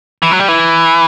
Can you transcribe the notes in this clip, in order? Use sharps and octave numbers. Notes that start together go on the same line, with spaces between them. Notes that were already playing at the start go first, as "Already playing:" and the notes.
E3
F#3
G3
E3